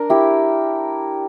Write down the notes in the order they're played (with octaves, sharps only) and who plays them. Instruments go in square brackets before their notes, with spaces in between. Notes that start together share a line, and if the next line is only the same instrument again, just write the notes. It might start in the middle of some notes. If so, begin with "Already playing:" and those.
Already playing: [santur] D4 A#4
E4 G4